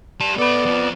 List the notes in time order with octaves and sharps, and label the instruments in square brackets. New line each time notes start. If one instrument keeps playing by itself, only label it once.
[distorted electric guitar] G3 A5
[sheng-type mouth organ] B3 D5 [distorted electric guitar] A4 B5
[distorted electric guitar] F2 F3